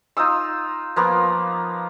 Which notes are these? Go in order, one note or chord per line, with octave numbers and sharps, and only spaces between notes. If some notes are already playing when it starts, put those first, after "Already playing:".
D#4 F4 D#6 E6
F3 A#3 B3